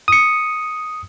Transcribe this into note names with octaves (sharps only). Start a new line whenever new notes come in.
D#6 C#7